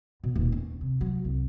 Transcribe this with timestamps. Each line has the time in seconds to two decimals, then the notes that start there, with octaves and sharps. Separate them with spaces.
0.23 B2
0.35 D#1
0.52 C#4
0.81 C3
1.01 F#3
1.25 C2